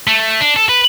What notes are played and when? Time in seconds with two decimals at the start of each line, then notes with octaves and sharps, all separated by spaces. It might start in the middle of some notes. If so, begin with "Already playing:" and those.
0.07 A3
0.40 D4
0.56 A4
0.69 B4